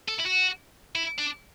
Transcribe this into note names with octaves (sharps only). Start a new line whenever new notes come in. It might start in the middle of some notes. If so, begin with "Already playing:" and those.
A4
E4
F#4
E4
D4